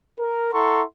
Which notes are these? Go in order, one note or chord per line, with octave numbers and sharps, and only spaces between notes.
A#4
E4 A4 F#5 A#5 C6 C#6